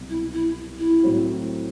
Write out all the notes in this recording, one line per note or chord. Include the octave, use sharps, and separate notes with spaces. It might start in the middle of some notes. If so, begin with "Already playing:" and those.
Already playing: C2 B2 F#3
E4
E4
E4
A2 F#3 C4 F#4